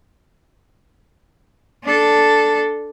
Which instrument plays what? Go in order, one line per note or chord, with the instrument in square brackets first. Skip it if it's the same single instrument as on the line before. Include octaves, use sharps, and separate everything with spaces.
[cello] D4 A4